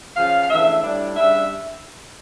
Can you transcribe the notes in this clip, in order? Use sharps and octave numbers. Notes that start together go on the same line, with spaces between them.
C#3 F3 C#4 F5
F5
C#3 E3 A3 D4 E5
A2 G3 D4
C#3 G3 D4 E5